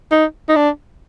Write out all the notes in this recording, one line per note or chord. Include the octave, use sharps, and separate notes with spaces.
D#4
D#4
D4